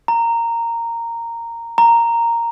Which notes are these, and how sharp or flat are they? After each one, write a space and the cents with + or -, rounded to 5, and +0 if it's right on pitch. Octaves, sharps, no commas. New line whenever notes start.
A#5 -10
A#5 -5